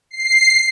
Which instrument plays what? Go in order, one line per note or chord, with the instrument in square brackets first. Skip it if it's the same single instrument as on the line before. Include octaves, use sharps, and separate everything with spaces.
[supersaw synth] C7